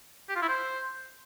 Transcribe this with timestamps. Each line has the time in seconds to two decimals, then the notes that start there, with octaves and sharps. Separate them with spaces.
0.29 G4
0.36 F4
0.42 E4
0.49 C5